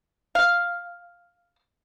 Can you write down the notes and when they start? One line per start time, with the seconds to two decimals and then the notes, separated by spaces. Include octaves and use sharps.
0.35 F5